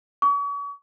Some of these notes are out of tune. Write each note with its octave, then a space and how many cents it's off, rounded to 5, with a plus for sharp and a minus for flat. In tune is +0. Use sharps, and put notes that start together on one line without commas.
C#6 +40